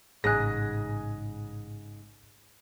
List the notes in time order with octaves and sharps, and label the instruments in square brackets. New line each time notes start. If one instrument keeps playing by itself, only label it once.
[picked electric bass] A1 [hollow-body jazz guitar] G#2 C#3 [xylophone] G#4 F#6 [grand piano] G#5 D#6 A#6